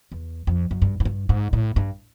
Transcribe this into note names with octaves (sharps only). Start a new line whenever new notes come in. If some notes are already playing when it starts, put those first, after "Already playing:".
E2
F2
F#2
G2
G#2
G2
G#2
A2
G2